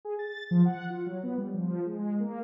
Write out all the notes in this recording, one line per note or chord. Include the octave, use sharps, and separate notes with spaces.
G#4
A6
F3
F#5
F4
F#3
B3
G3
F3
G#3
A#3